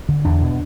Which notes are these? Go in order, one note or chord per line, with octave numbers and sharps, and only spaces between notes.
D3
E2 D4
B2